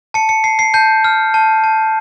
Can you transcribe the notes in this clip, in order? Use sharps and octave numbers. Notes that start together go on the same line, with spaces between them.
A5 C#7
C#7
A5 C7
C7
A5 G6
F6
A5
A5